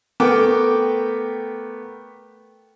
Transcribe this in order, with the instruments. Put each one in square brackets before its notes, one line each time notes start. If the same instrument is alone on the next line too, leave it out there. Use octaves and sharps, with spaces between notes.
[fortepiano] A3 B3 A#4 G5 D6